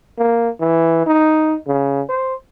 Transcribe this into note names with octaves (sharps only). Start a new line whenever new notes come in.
A#3
E3
D#4
C#3
C5